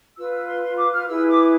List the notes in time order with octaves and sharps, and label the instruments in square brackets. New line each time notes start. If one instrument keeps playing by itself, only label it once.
[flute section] F4 B4 E6
E6
C6
C6
D6
F6
E4 G#4 B4 E6
D6